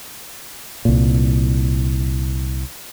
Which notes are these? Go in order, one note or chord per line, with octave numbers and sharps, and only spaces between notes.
C2 A#2